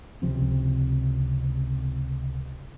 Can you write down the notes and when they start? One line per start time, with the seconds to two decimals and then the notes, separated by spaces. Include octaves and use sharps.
0.22 C#2 C3 F3 C4